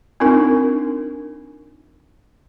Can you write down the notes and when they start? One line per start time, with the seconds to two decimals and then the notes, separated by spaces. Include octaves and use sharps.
0.20 C4 D4 D#4 F4 A#4